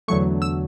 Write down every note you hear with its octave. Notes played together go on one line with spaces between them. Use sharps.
E2 D3 F#3 A3 C#6
E6